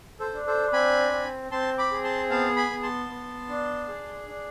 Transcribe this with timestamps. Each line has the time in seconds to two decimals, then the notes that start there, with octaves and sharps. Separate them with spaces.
0.19 A4 C5
0.34 D4
0.47 A4 C5
0.73 C4 G#5 B5
1.12 C4
1.51 C4 A5 C6
1.78 B5 D6
1.91 G#4
2.04 A5 C6
2.30 B3 F5 A5
2.56 G#5 B5
2.70 B3
2.82 A5 C6
3.09 B3
3.49 D4
3.88 G#4
4.28 D4